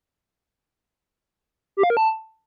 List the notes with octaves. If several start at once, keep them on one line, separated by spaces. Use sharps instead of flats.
G4
F5
A#4
A5